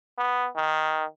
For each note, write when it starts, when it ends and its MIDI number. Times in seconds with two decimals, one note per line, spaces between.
0.18 0.48 59
0.56 1.05 51